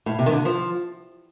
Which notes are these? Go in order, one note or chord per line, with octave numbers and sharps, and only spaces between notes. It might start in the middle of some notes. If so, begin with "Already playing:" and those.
A2
C3
D#3
D3
F3